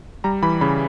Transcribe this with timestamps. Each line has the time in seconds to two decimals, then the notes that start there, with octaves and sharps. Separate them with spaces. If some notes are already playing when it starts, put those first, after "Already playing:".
0.24 G3 A#5
0.43 E3 B5
0.61 C#3 B5